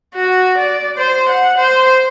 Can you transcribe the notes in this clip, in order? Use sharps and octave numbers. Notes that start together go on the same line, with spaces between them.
F#4
D5
C5
F#5
C5